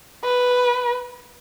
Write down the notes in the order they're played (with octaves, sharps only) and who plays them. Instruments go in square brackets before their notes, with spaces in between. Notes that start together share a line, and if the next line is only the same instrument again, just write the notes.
[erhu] B4